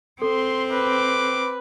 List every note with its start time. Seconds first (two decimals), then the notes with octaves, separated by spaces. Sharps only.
0.22 C4 A4 C6
0.71 B4 D6